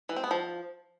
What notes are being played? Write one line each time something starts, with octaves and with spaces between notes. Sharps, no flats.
E3
C4
B3
F3